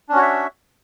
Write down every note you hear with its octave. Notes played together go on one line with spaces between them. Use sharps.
C#4 D4 F#4 C#5 E5